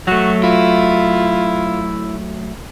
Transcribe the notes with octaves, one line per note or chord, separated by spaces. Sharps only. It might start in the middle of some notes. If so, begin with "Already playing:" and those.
F#3 A3 F#4
E4 F4